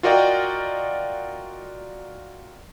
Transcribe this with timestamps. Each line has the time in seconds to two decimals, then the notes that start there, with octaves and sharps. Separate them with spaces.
0.03 F4 F#4 A#4 D5 D#5 G5